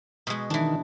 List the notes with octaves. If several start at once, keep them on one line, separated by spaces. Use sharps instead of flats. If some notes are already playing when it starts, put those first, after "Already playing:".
B2 G#3
D#3 E3 D4